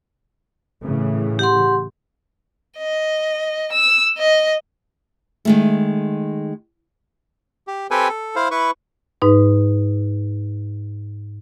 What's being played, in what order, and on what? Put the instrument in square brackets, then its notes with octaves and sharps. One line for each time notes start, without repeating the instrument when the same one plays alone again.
[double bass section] A2 C#3 E3
[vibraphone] G4 F#5 C6
[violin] D#5
E6
D#5
[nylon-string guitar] D#3 G#3 A3
[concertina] G4
C4 G4 A4 B4 G5 G#5
A4
E4 C5 F5
E4 B4 C#6
[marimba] G#2 D#4 B4